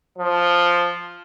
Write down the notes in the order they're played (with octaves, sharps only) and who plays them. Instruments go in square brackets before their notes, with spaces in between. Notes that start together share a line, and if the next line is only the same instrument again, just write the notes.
[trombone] F3